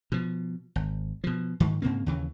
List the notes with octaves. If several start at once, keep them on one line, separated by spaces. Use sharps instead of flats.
B2 F3
G#1
B2 F3
G#2 D#3
G#2 C#3 A#3 C4
D#2 C#3 E3